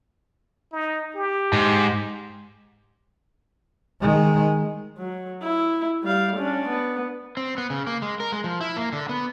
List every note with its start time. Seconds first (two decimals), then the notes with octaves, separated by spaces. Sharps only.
0.72 D#4
1.16 G4
1.53 G#2
4.01 D#3 G#3
4.98 F#3
5.42 E4
6.03 G3 F5
6.37 C#4 D4
6.68 B3
7.37 C4
7.58 B3
7.70 C#3
7.87 A#3
8.02 G#3
8.20 A#4
8.32 G#3
8.44 F3
8.61 E4
8.76 A#3
8.93 D3
9.09 B3